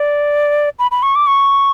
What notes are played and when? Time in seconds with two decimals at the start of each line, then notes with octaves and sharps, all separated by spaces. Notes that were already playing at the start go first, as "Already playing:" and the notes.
Already playing: D5
0.79 B5
0.91 B5
1.03 C#6
1.15 D6
1.27 C#6